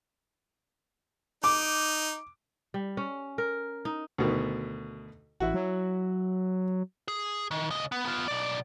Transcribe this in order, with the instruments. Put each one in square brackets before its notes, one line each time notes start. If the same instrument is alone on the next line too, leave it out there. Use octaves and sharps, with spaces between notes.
[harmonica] D#4 [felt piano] D6
[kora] G3
C#4
A#4
D#4
[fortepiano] D2 B2 D#3
[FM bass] A1 [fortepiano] E4 F#4
[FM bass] F#3
[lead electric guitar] G#4
D#3
C#3 D#5
B3
B3 F4
B1 D5